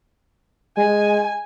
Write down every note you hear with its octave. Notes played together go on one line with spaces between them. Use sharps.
G#3 G#5